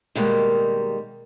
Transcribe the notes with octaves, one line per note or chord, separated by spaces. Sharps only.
B2 D#3 G3 G#3 A#3